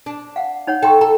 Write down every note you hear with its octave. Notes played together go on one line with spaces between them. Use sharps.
D4
F5 F#5
D#4 C#5 F#5
A4 G5 C6 C#6
A4 A#5